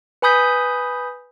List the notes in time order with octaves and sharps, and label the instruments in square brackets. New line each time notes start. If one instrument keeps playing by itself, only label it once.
[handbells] B4 G#5 B5 D#6 G6 B6